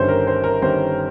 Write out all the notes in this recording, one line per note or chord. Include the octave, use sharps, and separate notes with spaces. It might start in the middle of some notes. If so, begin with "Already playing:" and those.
Already playing: G1 G2 D#3 G3 C#4 C5
A#4
C5
A#4
G1 G2 D#3 G3 C#4 C5